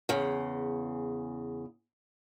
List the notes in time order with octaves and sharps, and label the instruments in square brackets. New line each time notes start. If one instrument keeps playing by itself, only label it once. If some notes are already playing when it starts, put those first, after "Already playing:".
[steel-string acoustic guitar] E2 C#3